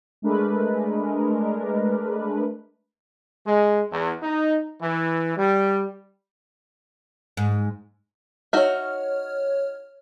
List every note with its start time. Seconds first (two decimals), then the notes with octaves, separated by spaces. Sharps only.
0.22 G#3 A3 D4 A#4 B4
3.47 G#3
3.92 E2
4.23 D#4
4.82 E3
5.38 G3
7.37 G#2
8.53 D#4 F#4 C#5 E5 F6